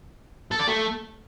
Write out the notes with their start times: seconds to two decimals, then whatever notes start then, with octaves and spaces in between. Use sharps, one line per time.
0.51 A4
0.59 D5
0.68 A3